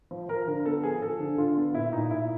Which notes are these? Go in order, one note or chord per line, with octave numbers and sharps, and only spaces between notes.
F3
F3 A#4
D3 A#4
B3 A4
F3 G#4
F3 A4
D3
D3 F4
B3
A#2 E4
A#2 D#4
A#2 E4